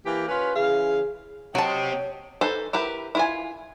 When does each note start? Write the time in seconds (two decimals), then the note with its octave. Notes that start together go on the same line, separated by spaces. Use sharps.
0.05 E3 A#3 G4
0.28 C#4 F4 B4
0.56 C#3 E3 G#4 F5
1.55 F#3 C4 G4 C#5 D#5 F#5 G5 A5
2.41 D#4 A4 B4 C5
2.73 E4 G4 A#4 B4
3.15 E4 F4 G#5